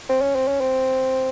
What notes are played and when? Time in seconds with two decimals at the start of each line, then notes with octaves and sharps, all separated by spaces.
0.09 C4
0.22 C#4
0.36 C4
0.48 C#4
0.61 C4